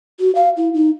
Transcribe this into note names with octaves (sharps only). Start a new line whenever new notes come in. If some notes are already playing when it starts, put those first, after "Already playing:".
F#4
F5
E4
D#4